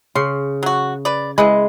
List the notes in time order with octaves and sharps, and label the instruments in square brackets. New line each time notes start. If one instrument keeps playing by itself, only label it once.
[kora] C#3 [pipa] C6
[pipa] F#3 F#4
B4 D5
[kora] G#3 [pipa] E4 G#4 B4